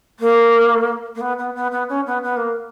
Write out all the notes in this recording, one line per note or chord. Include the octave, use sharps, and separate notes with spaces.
A#3
A#3
B3
B3
B3
B3
C#4
B3
B3
A#3